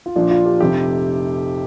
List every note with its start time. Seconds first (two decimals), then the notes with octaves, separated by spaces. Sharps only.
0.06 F4
0.16 A#1 A#2 F3 D4
0.31 F4
0.46 G4
0.60 F1 F2 C3 G4